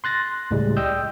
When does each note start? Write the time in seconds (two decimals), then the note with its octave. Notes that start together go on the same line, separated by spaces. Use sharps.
0.04 C6 F#6 A6 A#6
0.51 C#2 A2 G3 G#3
0.77 D5 D#5 G5 D#6 E6 G6